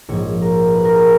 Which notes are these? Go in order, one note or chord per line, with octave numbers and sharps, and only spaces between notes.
A#1 G#2 F3 C#5
A#4
B4
A#4
G#4